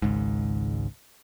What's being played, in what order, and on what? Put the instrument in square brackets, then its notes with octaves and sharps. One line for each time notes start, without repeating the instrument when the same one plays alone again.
[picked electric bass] G#1 C#2 G#2